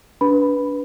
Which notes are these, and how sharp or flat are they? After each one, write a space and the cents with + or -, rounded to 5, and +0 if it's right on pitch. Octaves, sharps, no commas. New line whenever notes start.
D4 -30 B4 -5 B5 +0